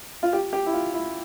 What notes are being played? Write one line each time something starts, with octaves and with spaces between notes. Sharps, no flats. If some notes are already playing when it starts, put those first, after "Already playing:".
F4
G4
G4
E4
F4
E4